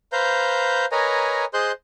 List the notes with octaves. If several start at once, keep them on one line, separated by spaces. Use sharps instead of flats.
B4 C5 F5 A#5 G6
A#4 B4 C#5 D#5 G#5 A#5
G#4 C5 D#5 C6 F#6 G6